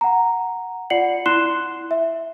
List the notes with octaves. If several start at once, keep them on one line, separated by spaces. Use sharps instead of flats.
F#5 A#5
F4 D5 F#5 C7 C#7 F#7
E4 C6 F#6 C7 E7 G7
E5